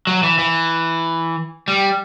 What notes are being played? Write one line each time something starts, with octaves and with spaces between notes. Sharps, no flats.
F#3
E3
E3
G3